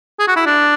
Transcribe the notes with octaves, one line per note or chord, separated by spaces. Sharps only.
G#4
F#4
E4
D4